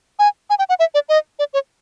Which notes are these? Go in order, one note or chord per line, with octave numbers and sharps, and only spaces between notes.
G#5
G#5
G5
F#5
E5
D5
D#5
D5
C#5